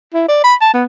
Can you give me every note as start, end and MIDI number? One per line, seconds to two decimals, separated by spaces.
0.14 0.24 64
0.28 0.42 74
0.44 0.55 83
0.61 0.71 81
0.74 0.85 59